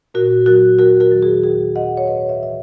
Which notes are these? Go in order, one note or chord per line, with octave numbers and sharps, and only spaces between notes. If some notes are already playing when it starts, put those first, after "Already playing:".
A#2 F#4 A#4
F#3 F#4 A#4
D#2 F#4 A#4
F#4 A#4
D#3 F#3
G#4
D#2 G#4
D#3 F#3 D#5 F#5
C#5
G#2 B4 D#5
C#5 E5
E3 E5